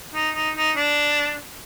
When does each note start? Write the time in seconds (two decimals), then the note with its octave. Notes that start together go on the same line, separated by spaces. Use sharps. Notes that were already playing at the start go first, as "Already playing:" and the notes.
0.15 D#4
0.35 D#4
0.56 D#4
0.77 D4